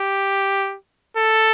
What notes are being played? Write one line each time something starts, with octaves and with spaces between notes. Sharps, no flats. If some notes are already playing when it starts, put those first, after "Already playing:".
Already playing: G4
A4